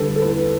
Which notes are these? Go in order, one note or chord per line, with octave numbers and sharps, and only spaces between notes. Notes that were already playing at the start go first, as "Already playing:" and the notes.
Already playing: D3 G3 A4 B4
A4
E2 B4